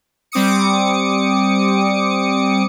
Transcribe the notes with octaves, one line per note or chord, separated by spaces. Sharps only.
G3 C4 D6 D#6 C#7